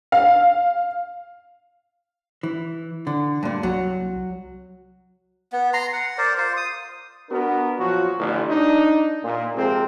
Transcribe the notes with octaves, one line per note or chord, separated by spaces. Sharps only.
F5
E3
D3
G2 A#2
C2 F#3
B3
A#5 C6
F#5
A#4 C5 D5
F4 C5
D#6
B3 D4 F#4 A#4
A#2 F3 F#3 F#4
A1 D3
D4 D#4
A#2
F2 C3 G#3 C4 A4 A#4